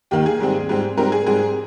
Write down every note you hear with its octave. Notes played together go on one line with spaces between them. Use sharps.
D#2 D#3 A#3 G4
G#4
G#2 G3 C4
G#2 G3 C4
G#2 G3 C4 A#4
G#4
G#2 G3 C4 G#4